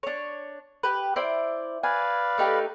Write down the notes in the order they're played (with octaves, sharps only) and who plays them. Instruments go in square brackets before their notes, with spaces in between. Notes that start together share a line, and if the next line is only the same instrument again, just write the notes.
[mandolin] D4 C#5
G4 B4
E4 C5 D5
[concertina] B4 D5 F5 [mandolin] G#5
[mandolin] A3 D#4 G4